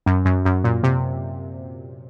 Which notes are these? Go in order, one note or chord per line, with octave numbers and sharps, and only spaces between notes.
F#2
F#2
F#2
A#2
C3